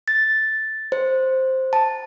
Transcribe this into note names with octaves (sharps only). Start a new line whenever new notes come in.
A6
C5
A5